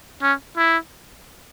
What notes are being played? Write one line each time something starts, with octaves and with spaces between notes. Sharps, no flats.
C#4
E4